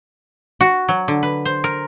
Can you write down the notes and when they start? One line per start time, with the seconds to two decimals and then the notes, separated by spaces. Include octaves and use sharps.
0.61 F#4
0.89 F#3
1.08 D3
1.23 B4
1.45 C5
1.64 A#4